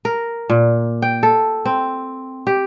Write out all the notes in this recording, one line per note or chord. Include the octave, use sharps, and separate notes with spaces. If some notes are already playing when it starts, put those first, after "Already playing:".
A#4
A#2
G5
A4
C4
G4